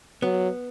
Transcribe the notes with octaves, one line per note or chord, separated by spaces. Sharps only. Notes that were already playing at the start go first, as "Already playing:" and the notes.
F#3 B3